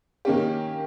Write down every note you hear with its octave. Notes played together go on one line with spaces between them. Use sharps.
D#3 A#3 C#4 G4